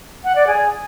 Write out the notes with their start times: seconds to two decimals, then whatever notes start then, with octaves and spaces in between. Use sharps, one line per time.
0.24 F#5
0.35 D5
0.47 G#4